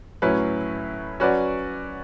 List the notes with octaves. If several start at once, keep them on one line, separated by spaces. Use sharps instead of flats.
A2 F#3 C#4 E4 B4
F#3 C#4 F#4 B4 D5